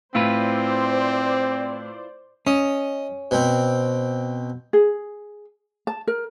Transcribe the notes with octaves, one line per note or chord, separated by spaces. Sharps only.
A2 C4 E4 F4 B4 C5 D5
C#4 D#5
B2 C4
G#4
A5
A#4